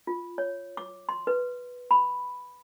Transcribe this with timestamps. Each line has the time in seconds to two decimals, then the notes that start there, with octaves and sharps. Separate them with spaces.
0.07 F4
0.38 C#5
0.77 D6
1.09 C6
1.27 B4
1.91 B5